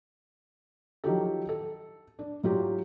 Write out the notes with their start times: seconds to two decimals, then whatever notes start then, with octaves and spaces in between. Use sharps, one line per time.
1.04 D#3 F3 F#3 G4 A4
1.49 A4
2.19 D4
2.44 G#2 F#3 F4 G4